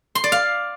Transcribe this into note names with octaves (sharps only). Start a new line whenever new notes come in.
C6
D5
F5